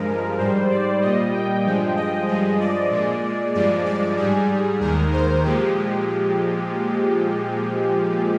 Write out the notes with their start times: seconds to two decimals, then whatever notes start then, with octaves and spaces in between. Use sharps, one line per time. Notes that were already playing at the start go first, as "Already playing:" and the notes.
Already playing: G2 F3 G#3 A#4
0.38 G#2 G3 C5
0.70 D5
1.01 A#2 G3 D#5
1.33 G5
1.65 G2 F3 G#3
1.96 D#5
2.28 G2 F3 G#3
2.60 D5
2.91 A#2 G#3
3.54 G2 F3 G#3 D5
3.86 D5
4.17 G#2 G3 G#4
4.80 D#2 D#3 G#3 A#4
5.12 C5
5.43 A#2 F3 G#3 G4